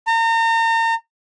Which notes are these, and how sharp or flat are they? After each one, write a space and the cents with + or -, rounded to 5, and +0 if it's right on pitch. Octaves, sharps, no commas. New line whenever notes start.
A#5 -40